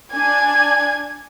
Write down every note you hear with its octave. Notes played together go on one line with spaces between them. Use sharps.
D4 D5 G#5 G#6